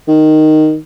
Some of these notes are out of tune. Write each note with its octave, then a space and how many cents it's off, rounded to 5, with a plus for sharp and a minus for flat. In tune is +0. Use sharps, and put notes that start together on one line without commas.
D#3 -5